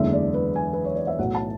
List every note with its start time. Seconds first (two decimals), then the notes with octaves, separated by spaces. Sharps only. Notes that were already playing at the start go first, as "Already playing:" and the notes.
Already playing: F#1 E2 D3 G#3 E5
0.13 D5
0.34 B4
0.56 G#5
0.73 B4
0.84 C#5
0.95 D5
1.07 E5
1.18 B1 A2 F#3 F#5
1.35 A5